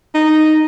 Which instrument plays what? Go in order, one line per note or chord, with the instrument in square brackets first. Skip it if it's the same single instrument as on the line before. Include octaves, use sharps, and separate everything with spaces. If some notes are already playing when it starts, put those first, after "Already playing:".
[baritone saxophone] D#4